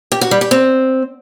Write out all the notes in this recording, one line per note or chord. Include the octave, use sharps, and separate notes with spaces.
G4
F#4
G3
G4
C4